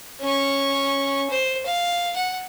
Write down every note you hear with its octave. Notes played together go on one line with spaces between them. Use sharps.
C#4 C#6
C5
F5
F#5